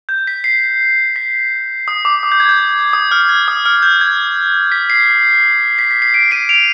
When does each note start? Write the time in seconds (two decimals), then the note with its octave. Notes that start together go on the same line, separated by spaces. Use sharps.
0.09 G6
0.27 B6
0.44 C7
1.16 B6
1.88 D#6
2.05 D6
2.23 D#6
2.32 G6
2.40 G#6
2.49 G6
2.93 D#6
3.11 F6
3.29 G#6
3.48 D#6
3.65 F6
3.83 G6
4.01 G#6
4.72 B6
4.90 C7
5.79 B6
5.91 B6
6.02 C7
6.14 B6 D7
6.31 C7 D#7
6.49 D7 F7